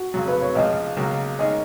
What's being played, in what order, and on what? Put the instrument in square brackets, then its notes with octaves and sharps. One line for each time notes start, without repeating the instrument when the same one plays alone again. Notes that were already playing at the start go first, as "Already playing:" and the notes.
Already playing: [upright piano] F#4
[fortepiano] F2 C#3 F#3
[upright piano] B4
C#5
[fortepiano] C#2 C#3 F3 [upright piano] D#5
[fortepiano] C#2 C#3 F#3 A#3 [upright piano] C#5
[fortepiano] D#3 G#3 C#4 G#4 [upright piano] D#5